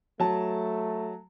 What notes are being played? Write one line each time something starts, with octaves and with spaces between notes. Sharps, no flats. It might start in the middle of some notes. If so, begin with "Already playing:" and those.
F#3 A3 A5